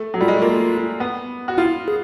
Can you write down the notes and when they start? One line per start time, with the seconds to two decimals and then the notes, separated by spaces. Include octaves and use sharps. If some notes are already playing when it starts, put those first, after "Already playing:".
Already playing: A3
0.14 F#3
0.21 G3 F4
0.28 G#3
0.34 A3
0.42 A#3 F4
1.00 B3
1.48 F#4
1.58 E4 F4
1.88 G#4